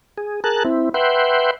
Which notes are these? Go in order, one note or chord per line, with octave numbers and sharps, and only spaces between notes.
G#4
G#4 A#4 A5 F#6
C4 E4
B4 E5 F#5 G5 C6